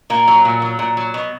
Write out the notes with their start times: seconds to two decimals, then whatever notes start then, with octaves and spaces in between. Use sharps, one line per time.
0.10 A#2 A#3
0.28 F#3
0.45 A#2
0.62 F#3
0.79 A#2
0.97 F#3
1.14 B2